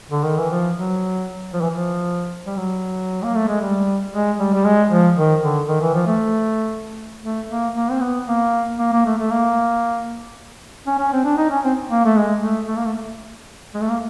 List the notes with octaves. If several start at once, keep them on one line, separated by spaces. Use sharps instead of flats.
D3
D#3
E3
F3
F#3
F3
E3
F3
G3
F#3
A#3
A3
G#3
G3
G#3
G3
G3
G#3
F3
D#3
D3
D#3
E3
F3
A3
A3
A#3
A#3
C4
B3
A#3
A#3
A#3
A3
A3
A#3
C#4
C#4
C4
D4
D#4
C#4
C4
A#3
A3
G#3
A3
A3
A#3
A3
G#3
A3
A#3